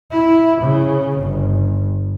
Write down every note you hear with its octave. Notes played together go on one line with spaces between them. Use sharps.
E4
C#3
G1